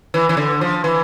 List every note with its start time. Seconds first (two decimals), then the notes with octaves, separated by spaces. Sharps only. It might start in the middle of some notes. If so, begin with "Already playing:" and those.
0.14 E3
0.29 E3
0.37 D3
0.61 F3
0.84 E3